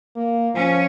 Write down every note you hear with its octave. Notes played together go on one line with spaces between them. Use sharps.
A#3
F3 C#4